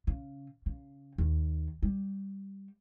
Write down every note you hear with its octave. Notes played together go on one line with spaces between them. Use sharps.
C#3
C#3
D#2
G3